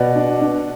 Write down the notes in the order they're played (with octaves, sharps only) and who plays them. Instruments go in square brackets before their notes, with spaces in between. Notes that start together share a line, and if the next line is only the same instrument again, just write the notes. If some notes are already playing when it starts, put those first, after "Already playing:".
Already playing: [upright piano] B2 D5 F#5
D4
D4